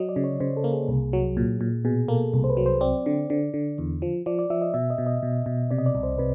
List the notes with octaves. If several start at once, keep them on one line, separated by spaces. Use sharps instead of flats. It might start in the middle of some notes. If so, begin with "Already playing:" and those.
Already playing: F#3 D#5
D5
C#3
C#5
C#3 C5
A4
A#3
G#4
C2
F#3
A#2
A#2
B2 G#4
A#3 A4
C2
C5
B4
F#3
C5
C4 D5
D3
D3
D3
E2
F3
F3 D5
D5
F3 E5
D#5
B2 E5
D#5
B2
D#5
B2
B2
C3 D5
D#5
D5
C2
C5
C3 B4